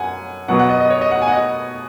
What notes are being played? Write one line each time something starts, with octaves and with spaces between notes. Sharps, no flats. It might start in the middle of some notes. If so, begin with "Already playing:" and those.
Already playing: F#2 F#5 G#5
B2 F#3 B3 F#5
F#5
D#5
D#5
C#5
D#5
F#5
G#5
F#5
D#5